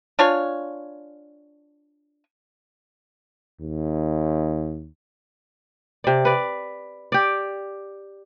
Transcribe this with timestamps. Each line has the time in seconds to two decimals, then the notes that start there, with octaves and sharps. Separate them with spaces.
0.19 D4 F4 C#5 G#5
3.61 D#2
6.04 C3 D5
6.25 B4 D5
7.12 G4 D5